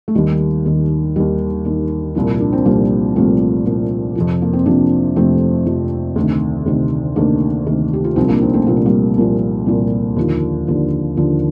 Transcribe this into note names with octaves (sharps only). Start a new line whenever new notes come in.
A3
D#2 D#3 G3
D#2 D#3
D#2 D#3 G3
D#2 D#3
C2 A#2 F3
D4
C4
C2 A#2 F3 G3 A#3
C2 A#2 F3 A3 C4
C2 A#2 F3
F2 C3 F3
A#3
C4
F2 C3 F3 A#3 D4
F2 C3 F3 A3 C4
F2 C3 F3
D2 C3 D#3
D2 C3 D#3
D2 C3 D#3 A#3 D4
D2 C3 D#3
G4
F4
C2 A#2 F3 C4 D#4
A#3 D4
C4 D#4
A3 C4
C2 A#2 F3 A#3
C4
G3 A#3
C2 A#2 F3
C2 A#2 F3
D#2 D3 F3
D#2 D3 F3
D#2 D3 F3